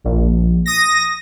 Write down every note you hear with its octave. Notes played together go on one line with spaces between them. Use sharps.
A#1
D#6 A#6